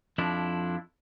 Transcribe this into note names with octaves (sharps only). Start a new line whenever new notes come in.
F2 F3 D4 E4